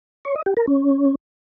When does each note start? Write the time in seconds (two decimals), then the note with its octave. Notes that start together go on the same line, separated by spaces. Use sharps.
0.25 C#5
0.36 D#5
0.46 G4
0.57 A#4
0.67 C#4